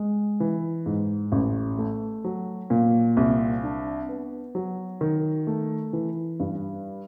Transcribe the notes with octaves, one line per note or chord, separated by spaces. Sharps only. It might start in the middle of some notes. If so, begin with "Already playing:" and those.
Already playing: G#3
E3
G#2
A1
A3
F#3
A#2
C2
D4
B3
F#3
D#3
A3
E3
G2